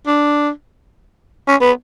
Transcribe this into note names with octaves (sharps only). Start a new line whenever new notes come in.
D4
C#4
B3